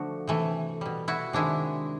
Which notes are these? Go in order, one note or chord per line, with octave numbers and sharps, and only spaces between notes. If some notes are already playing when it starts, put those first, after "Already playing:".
Already playing: D3 F3 A3 D4 F#4
C3 E3 A3
B2 G3
E4 F#4
C3 D#3 G#3 D4 E4